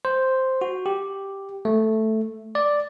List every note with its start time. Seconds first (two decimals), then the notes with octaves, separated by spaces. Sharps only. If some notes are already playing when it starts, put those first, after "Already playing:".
0.05 C5
0.61 F#4
0.86 G4
1.65 A3
2.55 D5